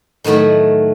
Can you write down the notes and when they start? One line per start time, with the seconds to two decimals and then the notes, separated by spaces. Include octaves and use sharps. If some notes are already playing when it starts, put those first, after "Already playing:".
0.24 A2 D#3 F#3 A3 B4